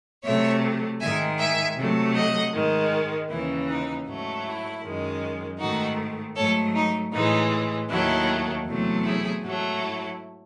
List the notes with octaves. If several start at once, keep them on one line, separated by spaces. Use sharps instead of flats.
C3 F#3 A3 C#5 E5
G#2 D#3 G#3 E5 G#5
E5 G#5
C3 F#3 A3
D#5 F#5
G#2 D#3 G#3
D#2 C#3 E3 E4
D#4
G#2 F#3 A3
E4
F#2 D#3 G#3
G#2 D#3 A3 D#4 F#4
G#2 F#3 A3 A4 C#5
D#4
A2 E3 G#3 D#4
D#2 D#3 F#3 A3 E4
E2 C3 F#3 A3
E4 G#4
G#2 F#3 A3
E4